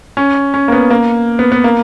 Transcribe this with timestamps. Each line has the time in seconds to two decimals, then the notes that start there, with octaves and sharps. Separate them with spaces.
0.17 C#4
0.54 C#4
0.68 A#3
0.72 B3
0.90 A#3
1.39 B3
1.52 B3
1.64 A#3